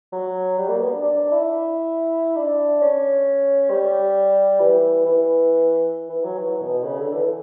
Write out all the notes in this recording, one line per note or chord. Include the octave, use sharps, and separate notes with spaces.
F#3
G3
A#3
B3
D4
D4
D4
E4
D4
C#4
G3
E3
E3
E3
F#3
E3
B2
C#3
D3
E3